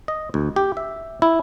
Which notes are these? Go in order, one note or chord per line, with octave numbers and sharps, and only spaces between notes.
D#5
D2
G4
E5
E4